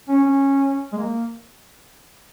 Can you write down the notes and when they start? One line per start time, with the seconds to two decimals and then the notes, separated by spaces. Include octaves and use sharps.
0.09 C#4
0.24 C#4
0.93 G#3
0.98 A#3